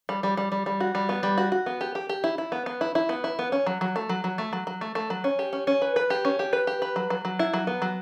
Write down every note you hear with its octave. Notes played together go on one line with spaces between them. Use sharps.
G3
G3
G3
G3
G3
F#4
G3
B3
G3
F#4
F#4
B3
G4
G4
G4
E4
E4
B3
B3
E4
E4
B3
E4
B3
C#4
F#3
F#3
A3
F#3
F#3
A3
F#3
F#3
A3
A3
F#3
C#4
G4
C#4
C#4
B4
B4
G4
C#4
G4
B4
G4
B4
F#3
F#3
F#3
E4
F#3
B3
F#3